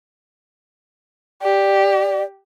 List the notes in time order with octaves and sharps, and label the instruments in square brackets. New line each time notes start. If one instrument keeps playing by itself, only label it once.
[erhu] G4 [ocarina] D5